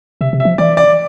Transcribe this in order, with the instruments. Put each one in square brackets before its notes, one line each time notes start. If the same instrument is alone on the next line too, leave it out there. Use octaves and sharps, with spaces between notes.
[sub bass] C3 [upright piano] E5
[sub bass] C3
[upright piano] E5
[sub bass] F3
[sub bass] E3 [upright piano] D5
[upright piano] D5